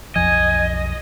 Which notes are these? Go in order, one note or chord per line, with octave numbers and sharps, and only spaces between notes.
B1 F2 F3 D#5 G#5